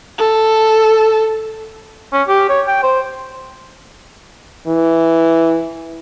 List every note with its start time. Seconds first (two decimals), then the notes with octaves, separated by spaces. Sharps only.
0.18 A4
2.13 C#4
2.28 G4
2.49 C#5
2.67 G5
2.83 C5
4.68 E3